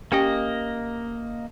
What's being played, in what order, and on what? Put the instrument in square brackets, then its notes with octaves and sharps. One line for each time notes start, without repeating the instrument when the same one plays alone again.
[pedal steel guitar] A#3 D#5 [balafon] C#4 G4 G5